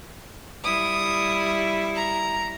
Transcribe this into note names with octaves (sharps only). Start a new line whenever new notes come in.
G3 E4 D#6
A#5